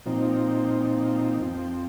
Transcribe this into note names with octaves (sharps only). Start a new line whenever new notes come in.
A#2 F3 C4 D#4
F2 F3 C4